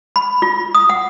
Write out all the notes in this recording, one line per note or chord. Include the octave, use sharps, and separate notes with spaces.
B5
F4
D#6
F#5